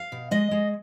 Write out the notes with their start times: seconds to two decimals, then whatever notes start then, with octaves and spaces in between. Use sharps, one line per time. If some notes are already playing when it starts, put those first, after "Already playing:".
Already playing: F5
0.12 B2
0.31 G#3 D#5
0.51 G#3